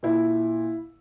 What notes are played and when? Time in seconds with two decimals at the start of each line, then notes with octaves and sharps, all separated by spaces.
0.03 A#2 E4